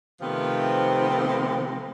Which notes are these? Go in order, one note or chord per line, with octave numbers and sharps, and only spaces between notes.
C3 D#3 F3 A3 B3 C4